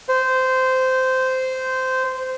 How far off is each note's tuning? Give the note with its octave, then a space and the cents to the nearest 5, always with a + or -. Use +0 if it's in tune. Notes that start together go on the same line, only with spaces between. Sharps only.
C5 -15